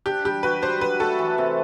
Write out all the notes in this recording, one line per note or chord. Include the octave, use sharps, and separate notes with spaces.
D4 G4
G3 G4
F#4 B4
D4 C5
F#3 B4
A3 A4
E3
C3